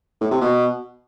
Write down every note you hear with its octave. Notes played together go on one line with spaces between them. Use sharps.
A2
C3
B2